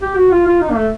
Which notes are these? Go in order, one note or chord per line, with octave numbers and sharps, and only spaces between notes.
G4
F#4
F4
F4
D#4
A#3
A3